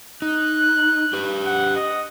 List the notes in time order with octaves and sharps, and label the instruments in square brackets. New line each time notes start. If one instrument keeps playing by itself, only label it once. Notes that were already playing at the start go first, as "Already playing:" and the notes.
[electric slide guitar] D#4 [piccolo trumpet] F#6
[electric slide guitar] G4 B4
[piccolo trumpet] F#5
D#5